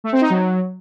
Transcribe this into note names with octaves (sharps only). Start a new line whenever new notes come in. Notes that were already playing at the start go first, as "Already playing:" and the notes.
A3
C4
D#4
F#3